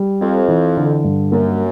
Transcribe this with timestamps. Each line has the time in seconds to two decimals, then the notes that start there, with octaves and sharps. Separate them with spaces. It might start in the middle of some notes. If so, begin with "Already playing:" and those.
Already playing: G3
0.21 F2 C4
0.48 E3
0.77 D3
1.04 G2
1.32 F#2 A#3